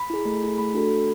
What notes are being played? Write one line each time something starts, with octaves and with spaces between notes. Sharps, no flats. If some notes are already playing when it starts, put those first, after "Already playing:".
Already playing: B5
E4 G#4
A3
E4 G#4
A3 B5
D4 F#4 A4
A3